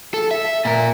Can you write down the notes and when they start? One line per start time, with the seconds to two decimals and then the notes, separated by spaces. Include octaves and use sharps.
0.14 A4
0.31 E5
0.65 A#2 A#4